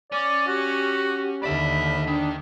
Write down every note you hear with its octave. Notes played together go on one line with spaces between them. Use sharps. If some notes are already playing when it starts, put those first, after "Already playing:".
C#4 D5
F#4 G4
D#2 D3 D5 E5 B5
D#3 D4